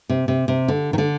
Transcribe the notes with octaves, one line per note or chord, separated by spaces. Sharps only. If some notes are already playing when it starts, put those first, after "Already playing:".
C3
C3
C3
D3
D#3
D3